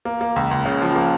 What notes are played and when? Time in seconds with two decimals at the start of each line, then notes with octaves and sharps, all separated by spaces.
0.05 A#3
0.21 A#3
0.36 C#2
0.51 C#2
0.65 C#3
0.82 F3
0.96 A#3